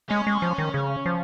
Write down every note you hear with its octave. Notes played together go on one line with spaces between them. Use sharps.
G#3 C#4
G#3
F3
D#3
C#3
F3